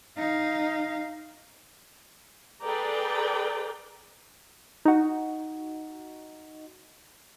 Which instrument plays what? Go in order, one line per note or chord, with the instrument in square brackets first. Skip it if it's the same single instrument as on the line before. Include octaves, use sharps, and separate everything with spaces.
[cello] D#4 F5
[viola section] G#4 A4 B4 D5 G5 A#5
[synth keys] D#4 F#4